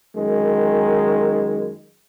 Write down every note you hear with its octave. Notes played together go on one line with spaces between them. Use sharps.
F#2 D#3 G#3